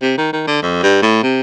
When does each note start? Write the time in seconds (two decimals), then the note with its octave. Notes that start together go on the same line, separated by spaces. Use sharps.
0.02 C3
0.18 D#3
0.33 D#3
0.47 D3
0.63 F2
0.83 G2
1.02 A2
1.23 C3